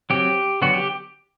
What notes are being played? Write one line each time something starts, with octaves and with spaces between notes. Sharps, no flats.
F#3 C4 G4
D3 F#3 B3 F#4
G4